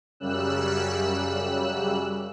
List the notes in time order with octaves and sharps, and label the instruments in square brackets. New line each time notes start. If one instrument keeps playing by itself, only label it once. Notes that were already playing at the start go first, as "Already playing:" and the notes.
[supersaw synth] F#2 C#3 G3 E6 F#6